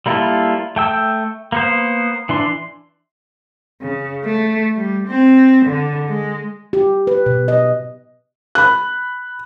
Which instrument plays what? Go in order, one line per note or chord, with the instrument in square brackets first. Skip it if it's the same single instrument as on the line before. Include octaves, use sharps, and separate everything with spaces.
[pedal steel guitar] G3 A#3 E4 F4 A4
A3 G5 E6
A#3 B3 C5
E3 D4 C6
[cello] C#3
A3
G3
C4
D3
G#3
[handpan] G4
B4
B2
D#5
[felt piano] B5 F#6